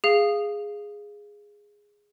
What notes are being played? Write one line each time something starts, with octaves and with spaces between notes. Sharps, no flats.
G#4 F5